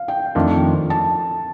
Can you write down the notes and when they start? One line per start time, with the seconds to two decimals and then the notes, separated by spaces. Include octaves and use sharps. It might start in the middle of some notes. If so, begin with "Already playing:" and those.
Already playing: F5
0.08 G5
0.35 F2 D#3 A3 D4 F4
0.90 A5